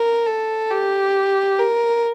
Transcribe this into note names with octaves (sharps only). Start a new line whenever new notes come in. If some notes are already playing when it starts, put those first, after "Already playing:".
Already playing: A#4
A4
G4
A#4